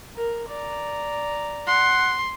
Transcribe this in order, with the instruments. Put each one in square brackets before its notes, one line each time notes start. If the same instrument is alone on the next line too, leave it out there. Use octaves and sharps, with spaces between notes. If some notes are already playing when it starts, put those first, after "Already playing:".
[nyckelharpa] A#4
D5 A#5
[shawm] F#5 [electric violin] C6